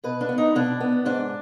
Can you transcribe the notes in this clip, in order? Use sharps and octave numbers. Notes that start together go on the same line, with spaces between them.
B2 B4
D4
B3
D#4
B2 D4
B3
G#2 D4